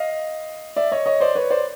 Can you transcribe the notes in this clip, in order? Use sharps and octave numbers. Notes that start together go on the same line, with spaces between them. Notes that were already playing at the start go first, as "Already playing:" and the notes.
Already playing: D#5 F5
D5 E5
C#5 D#5
C#5 D#5
C5 D5
B4 C#5
C5 D5